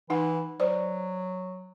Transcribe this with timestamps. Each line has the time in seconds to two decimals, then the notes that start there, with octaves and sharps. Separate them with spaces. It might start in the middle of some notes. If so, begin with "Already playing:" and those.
0.10 E3 D#4 F#5
0.60 F#3 C5 D5